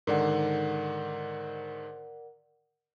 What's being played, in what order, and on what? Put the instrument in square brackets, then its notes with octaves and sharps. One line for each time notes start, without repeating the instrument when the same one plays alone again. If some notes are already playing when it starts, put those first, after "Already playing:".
[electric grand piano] G#2 D3 D#3 [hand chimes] A#4 D5 F#5